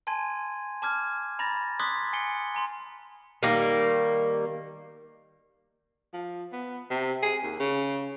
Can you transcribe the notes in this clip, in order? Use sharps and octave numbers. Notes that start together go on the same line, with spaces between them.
G#5 A5 C6 G#6 D#7
A5 D6 F6 G#6
A#5 B5 A6 A#6
C6 D6 D#6 F#6 G#6 B6
G#5 C7 C#7 G7
G#5 A#5 C6
D#3 G3 A#3
F3
B3
C3
G#4
D#2
C#3